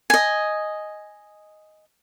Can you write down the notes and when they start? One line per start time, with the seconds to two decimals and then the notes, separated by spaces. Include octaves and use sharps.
0.10 D#5 G#5